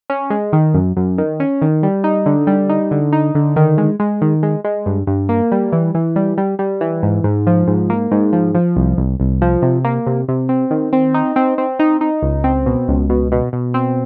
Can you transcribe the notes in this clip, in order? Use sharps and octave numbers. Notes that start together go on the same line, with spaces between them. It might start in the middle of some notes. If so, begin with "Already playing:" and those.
C#4
G#3
D#3
F#2
F#2
D#3
C#4
D#3
G3
D#4
D3
G3
D#4
D3
D#4
D3
D#3
G#3
G#3
D#3
G#3
G#3
G2
G2
A#3
G3
E3
E3
G3
G3
G3
E3
G#2
G#2
F3
G#2
A#3
G#2
F3
F3
C2
C2
C2
F3
C3
A#3
C3
C3
C4
D#3
C4
D#4
C4
C4
D#4
D#4
C#2
C4
B2
C#2
B2
B2
B2
C4